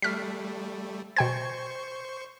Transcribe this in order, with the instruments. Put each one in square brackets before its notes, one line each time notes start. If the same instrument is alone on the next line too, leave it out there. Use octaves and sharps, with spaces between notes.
[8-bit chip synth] G3 A3 [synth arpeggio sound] F6 B6
[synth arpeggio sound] B2 G5 G#6 [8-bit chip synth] C5 C#6